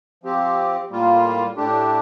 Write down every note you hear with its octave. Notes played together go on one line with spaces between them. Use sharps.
F3 C4 G4
A2 G3 A#3 F4
A2 A3 D4 G4